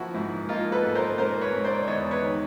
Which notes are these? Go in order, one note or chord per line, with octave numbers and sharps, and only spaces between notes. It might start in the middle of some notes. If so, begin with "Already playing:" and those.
Already playing: F3 A#3 E4 F#4
G#2 E4
A#3 D#4 F4
A4 B4
G#2
A#4 C5
G#2 A#4 C5
B4 C#5
G#2
C5 D5
E2 C#5 D#5
B4 C#5
D#3